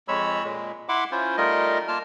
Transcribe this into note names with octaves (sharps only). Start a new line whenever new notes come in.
F2 G#3 C#5 B5 E6
A#2 G#3
E4 E5 F#5 B5 C6 D6
C#4 E4 F4 C5
G3 A3 D#4 F4 A#4 D#5
A#3 F4 A5 F6